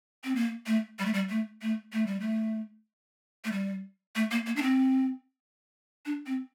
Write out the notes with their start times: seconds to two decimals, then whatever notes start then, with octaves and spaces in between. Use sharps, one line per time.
0.24 C4
0.36 A#3
0.67 A3
0.99 G3
1.06 A3
1.13 G3
1.30 A3
1.62 A3
1.93 A3
2.07 G3
2.20 A3
3.45 A3
3.52 G3
4.15 A3
4.31 A#3
4.46 A#3
4.56 D4
4.62 C4
6.06 D4
6.26 C4